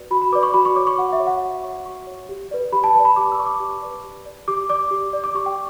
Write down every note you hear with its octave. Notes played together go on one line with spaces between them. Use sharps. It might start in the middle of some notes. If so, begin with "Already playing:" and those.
Already playing: F#4 B4 D5
F#4 B5
B5
B4 D5 D6
C#6
F#4 B5
C#6
C#5 D6
C#6
F#4 F#5
E5
C#5
F#5
F#4
C#5 C#6
F#4 C#6
C#5
G4
B4 D5
G4 B5
A5
B4 D5 A5
B5
G4 D6
E6
B4 D5 C#6
D6
G4
B4 D5
G4
D5
G4 D6
D5 D6
G4
D5
D6
G4 C#6
G5